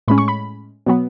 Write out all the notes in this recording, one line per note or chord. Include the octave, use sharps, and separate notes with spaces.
A2 G#3 C#4 B5
C#6
B5
B2 F#3 B3